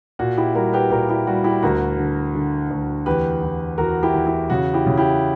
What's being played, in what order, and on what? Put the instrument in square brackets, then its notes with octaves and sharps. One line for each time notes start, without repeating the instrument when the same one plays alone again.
[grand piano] A#2 F#4
E4 G4
G3 F#4 A#4
G4 B4
A#2 F#4 A#4
E4 G4
G3 F#4
E4 G4
D2 F#4 A#4
D3
D3
D2
E2 G4 B4
E2
E2 F#4 A#4
E4 G4
E2
E4
C#3 F#4
E4 G4
C#3
E4 G4